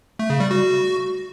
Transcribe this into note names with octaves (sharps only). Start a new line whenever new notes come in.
A3
C#3
G3
F#4